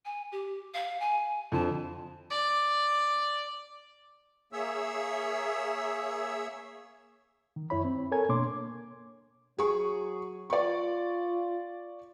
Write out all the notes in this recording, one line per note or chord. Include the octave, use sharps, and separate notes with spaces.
G#5
G4
F5
G#5
F2 D3 A5
D5
A#3 G#4 C#5 E5 E6
D#3
F#2 E4 C#5 B5
C4
A4 A#4 C#5 G#5 G#6
B2 A#3 D4 C#5 C6 D6
F#3 G#4 C#6
F4 D5 C#6